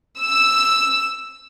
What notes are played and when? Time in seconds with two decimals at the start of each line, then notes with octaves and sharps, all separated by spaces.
0.20 E6